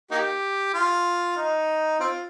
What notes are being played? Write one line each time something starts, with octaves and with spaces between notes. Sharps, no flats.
A#3 D#4 G4
F4
D#4
C4 F4